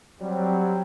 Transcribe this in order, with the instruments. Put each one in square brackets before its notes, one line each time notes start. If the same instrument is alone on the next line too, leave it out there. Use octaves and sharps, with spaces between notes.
[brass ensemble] F#3 G3 C4